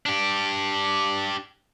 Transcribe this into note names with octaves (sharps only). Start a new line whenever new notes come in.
D4 G4